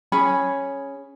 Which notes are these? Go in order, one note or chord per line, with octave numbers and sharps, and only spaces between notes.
C#4 G#4 B5